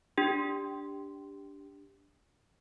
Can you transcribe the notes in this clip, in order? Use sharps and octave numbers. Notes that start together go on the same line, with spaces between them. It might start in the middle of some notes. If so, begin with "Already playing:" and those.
D4 G4